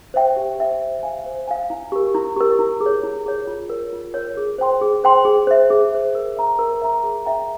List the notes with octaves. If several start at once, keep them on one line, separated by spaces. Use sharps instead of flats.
C5 E5 G5
G4
C5 E5 G5
C5
F5 G#5
C5
F5 G#5
E4
G4 A#4
E4
G4 A#4
E4
G#4
C#5
E4
G#4 C#5
F4
A#4 C#5
F4
A#4 C#5
G#4
C5 G5 C6
G#4
C5 G5 C6
G#4
C5 E5
G#4
C5 E5
A#4
E5 A#5
A#4
E5 A#5
G#4
E5 G5 A#5